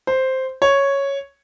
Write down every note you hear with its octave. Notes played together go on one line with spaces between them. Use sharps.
C5
C#5